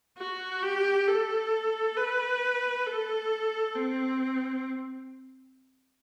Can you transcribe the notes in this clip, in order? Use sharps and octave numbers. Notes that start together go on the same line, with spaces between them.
F#4
G4
A4
B4
A4
C4